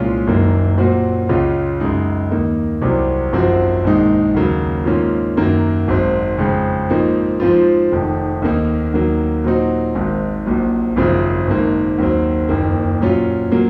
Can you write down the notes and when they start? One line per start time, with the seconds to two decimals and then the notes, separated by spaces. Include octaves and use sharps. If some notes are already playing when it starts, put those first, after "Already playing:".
Already playing: C2 A#2 G#3 C#4 F4
0.27 F#1 F#2 D#3 F#3 A#3
0.78 A#2 F#3 C4 F#4
1.29 C#2 C#3 G#3 C#4 F4
1.80 F#2 C#3 G#3 D#4
2.31 D#2 D#3 A#3 D#4
2.82 C2 C3 F#3 C4
3.32 G#1 F#2 F3 C4 F#4
3.85 A#1 G#2 D#3 G#3 D#4
4.34 D#2 C#3 F#3 A#3
4.85 G#2 D#3 A#3 C#4 F4
5.37 F#2 D#3 F#3 A#3
5.88 G#1 G#2 F#3 C4
6.38 F2 C#3 G#3
6.90 G#2 F3 A#3 D#4
7.40 G#2 F3 C4 F4
7.91 F1 F2 D#3
8.42 D#2 D#3 A#3 D#4
8.94 D#2 D#3 F#3 A#3
9.44 A#2 F#3 C4 D#4 F#4
9.95 G#1 G#2 D#3
10.45 A#1 A#2 F#3
10.96 G#1 F#2 C#3 F3 C4
11.48 G#1 G#2 D#3 A#3
11.98 D#2 D#3 F#3 C4
12.49 F#1 F2 D#3 A#3
13.00 A#2 F#3 C#4 F4
13.51 A#2 F#3 A#3